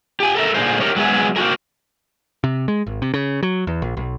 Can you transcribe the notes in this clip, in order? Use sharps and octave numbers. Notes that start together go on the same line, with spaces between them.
G4 G#5
A4 A#4 E5
A#2 D3 F3 G#4 C5
G4 A#4 C#5
F#3 G#3 B3 G#4 E5
A#3 C4 F#4 G#4 A#4
C3
G#3
G#1
C3
C#3
F#3
E2
A#1
B1